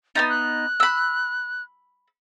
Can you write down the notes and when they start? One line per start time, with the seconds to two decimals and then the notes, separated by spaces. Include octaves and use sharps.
0.15 B3 C#4 D#4 A6
0.29 F#6
0.80 B5 E6